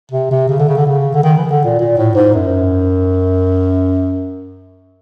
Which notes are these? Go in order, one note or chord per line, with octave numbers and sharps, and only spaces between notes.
C3
C3
C#3
D3
C#3
D3
C#3
D3
D#3
E3
D#3
D3
A#2
A#2
A2
G#2
F#2